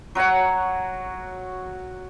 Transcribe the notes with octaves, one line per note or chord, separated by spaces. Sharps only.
F#3 F#4 C#5 F#5